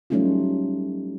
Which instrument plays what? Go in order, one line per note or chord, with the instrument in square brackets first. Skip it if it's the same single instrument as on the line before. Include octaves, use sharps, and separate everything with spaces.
[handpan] F#3 G3 A3 C#4 D#4 F4